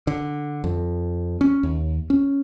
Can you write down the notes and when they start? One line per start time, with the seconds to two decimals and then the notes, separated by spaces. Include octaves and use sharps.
0.07 D3
0.64 F2
1.41 C#4
1.63 D#2
2.10 C#4